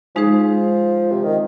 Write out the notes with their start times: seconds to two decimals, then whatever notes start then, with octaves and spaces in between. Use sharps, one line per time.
0.15 F3 G#3 D#4 G#4 C5
1.11 C3
1.24 D#3